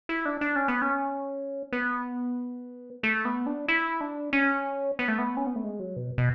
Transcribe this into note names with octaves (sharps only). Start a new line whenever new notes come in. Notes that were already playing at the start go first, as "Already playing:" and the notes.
E4
D4
D4
C#4
B3
C#4
B3
A3
B3
D4
E4
D4
C#4
B3
A3
B3
C#4
B3
A3
G#3
F#3
B2
B2